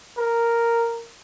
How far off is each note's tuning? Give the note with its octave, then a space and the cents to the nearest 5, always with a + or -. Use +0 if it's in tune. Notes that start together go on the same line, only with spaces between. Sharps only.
A#4 -5